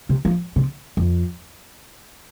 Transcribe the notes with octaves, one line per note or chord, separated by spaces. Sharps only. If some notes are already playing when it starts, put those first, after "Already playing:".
C3
F3
C3
F2